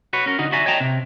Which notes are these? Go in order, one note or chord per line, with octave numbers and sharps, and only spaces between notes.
F#4 B4 C#5
C#4 A#4
D3 D#4 F#4
F#4 D5 E5 G#5 A#5
C#5 D#5 G5 A5 A#5
C3